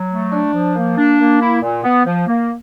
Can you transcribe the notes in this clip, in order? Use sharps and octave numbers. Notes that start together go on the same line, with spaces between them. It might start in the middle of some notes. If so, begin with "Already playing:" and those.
Already playing: F#3
A3
D4
F3
A#3
D4
A#3
E4
A#2
B3
F3
A#3